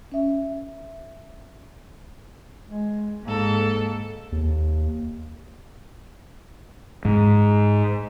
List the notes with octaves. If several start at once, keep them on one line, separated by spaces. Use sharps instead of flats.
C#4 E5
G#3
G#2 A#3 A4
D#2
G#2 G#3